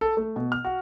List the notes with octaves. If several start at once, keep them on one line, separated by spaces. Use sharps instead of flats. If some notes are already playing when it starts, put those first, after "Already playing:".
A4
A3
B2
F6
F#4